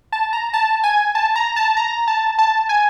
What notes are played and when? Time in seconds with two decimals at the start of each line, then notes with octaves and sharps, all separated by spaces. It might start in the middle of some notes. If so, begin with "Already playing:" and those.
0.13 A5
0.33 A#5
0.54 A5
0.84 G#5
1.15 A5
1.36 A#5
1.56 A5
1.77 A#5
2.08 A5
2.39 A5
2.69 G#5